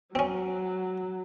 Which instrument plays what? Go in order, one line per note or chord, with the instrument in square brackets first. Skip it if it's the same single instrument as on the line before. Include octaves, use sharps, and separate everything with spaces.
[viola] F#3 [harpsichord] C4 C#4